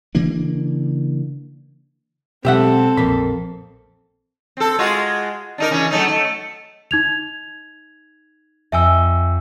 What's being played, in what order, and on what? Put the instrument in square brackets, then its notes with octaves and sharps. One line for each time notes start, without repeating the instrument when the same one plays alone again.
[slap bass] C#3 E3 A#3 D4
[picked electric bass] B2 F#3 G#3 [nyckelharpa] C4 A4 [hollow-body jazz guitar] G4 E5 F#5
[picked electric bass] A#1 A#2 [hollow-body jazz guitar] F2 A#3 B5
[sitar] C4 A4
G#3 F4 F#4
D4 D#4 A#4
C#3 E3 C#4
F#3 A3 D#4
A3
[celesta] D#4 G#6 F7
[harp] F2 D#5 G5 [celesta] E5 G#5 E6